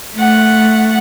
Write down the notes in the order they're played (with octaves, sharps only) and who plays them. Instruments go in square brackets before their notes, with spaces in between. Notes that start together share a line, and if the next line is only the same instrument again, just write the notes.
[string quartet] A3 F#5